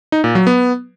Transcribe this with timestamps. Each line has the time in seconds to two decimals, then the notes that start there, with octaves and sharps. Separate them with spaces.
0.12 D#4
0.24 A#2
0.35 F#3
0.47 B3